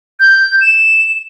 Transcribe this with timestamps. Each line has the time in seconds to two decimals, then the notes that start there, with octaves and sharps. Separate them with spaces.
0.20 G6
0.61 E7